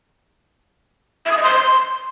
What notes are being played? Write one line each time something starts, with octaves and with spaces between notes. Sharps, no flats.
E5
D#6
D#5
C6